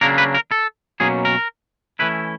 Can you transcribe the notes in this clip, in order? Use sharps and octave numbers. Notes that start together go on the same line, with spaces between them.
C#3 F#3 A#3 D4 A#4
B4
A#4
A4
B2 F#3 A#3 C#4 G#4
A#4
E3 A3 C#4 E4 B4